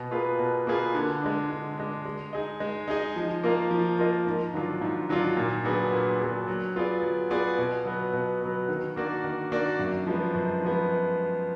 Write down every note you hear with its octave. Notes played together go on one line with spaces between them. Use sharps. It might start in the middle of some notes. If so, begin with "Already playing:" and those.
Already playing: B2
A#3 F4 G#4 B4
B2
A#3 F4 G#4 B4
D3
G#3 D4
D3
G#3 D4
G#3
D#4 G#4 D#5
G#3
D#4 G#4 D#5
F3
A#3 F4 A#4 D#5
F3
A#3 F4 A#4 D#5
G#2
D#3 F#3 D4 F4
G#2
D#3 F#3 D4 F4
A#2
F#3 B3 D4 G#4
A#2
F#3 B3 D4 G#4
F#3
B3 F4 G#4 D5
F#3
B3 F4 G#4 D5
B2
F#3 B3
B2
F#3 B3
D#3
A#3 D4 F#4 D5
D#3
A#3 D4 F#4 D5
F#2
F3 G#3 B3
F#2
F3 G#3 B3